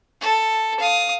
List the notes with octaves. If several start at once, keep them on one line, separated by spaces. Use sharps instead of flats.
A4
F5 D#6